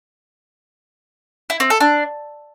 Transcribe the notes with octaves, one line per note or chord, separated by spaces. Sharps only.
E4
C4
A4
D4